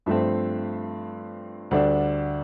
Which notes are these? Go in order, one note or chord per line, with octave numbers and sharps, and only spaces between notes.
G2 F3 A3 C4 E5
D2 D3 G3 D4